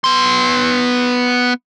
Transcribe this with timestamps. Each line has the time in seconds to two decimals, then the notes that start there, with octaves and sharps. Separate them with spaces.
0.04 B3 C6